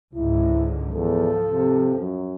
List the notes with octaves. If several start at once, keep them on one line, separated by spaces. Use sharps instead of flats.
C#2 G#2 D3 E4
E2 F3 A4
C3
F#2